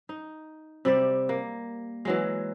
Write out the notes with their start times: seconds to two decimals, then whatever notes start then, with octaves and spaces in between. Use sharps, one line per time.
0.09 D#4
0.85 C3 G3 D5 E5
1.29 A#3
2.05 E3 F#3 G#3